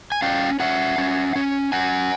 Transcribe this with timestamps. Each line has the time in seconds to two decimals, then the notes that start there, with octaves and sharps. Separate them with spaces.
0.12 G#5
0.22 C#4 F5 G5
0.60 C#4 E5 F#5
0.98 C#4
1.36 C#4
1.72 C#4 F#5 G#5